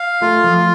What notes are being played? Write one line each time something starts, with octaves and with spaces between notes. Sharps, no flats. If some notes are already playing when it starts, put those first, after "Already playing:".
Already playing: F5
A3 F4
F3